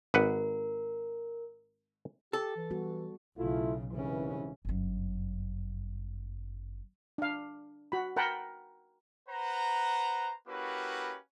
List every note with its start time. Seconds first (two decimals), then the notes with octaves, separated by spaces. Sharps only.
0.14 G#1 A#4 B4 F#5
2.33 G4 A4
2.57 E3
2.70 G3 B3 F#4
3.37 B1 C#3 A3 E4 F4
3.92 C2 G#2 C#3 E3 C#4
4.65 G1 F#2
7.18 D4 F5
7.92 F#4 B5
8.16 A#4 F#5 G5 A5 B5
9.29 B4 C5 F#5 A#5
10.48 A#3 C#4 E4 F#4 G4 B4